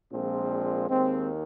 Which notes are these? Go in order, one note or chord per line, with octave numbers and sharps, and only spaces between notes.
A#1 A#2 F3 G#3 C4
D#2 D#3 G#3 C4